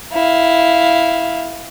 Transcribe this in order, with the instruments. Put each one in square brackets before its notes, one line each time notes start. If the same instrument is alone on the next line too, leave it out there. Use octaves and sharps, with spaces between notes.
[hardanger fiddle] E4 F5